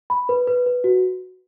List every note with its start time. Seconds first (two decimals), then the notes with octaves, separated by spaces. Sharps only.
0.10 B5
0.29 B4
0.47 B4
0.66 B4
0.84 F#4